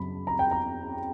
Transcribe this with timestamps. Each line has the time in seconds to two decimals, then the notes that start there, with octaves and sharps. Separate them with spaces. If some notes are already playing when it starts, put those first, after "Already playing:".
Already playing: F#2 C#3 F#3 B5
0.27 A#5
0.39 G5
0.51 A#5